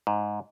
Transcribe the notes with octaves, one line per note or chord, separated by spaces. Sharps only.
G#2